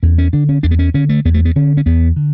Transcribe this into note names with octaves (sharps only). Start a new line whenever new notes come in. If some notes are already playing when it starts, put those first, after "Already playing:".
E2 C#4
C#4
D3 D4
C#4
E2 D4
B3
C#4
D3 C#4
A3
E2 B3
A3
B3
D3 C#4
C#4
E2 B3
D3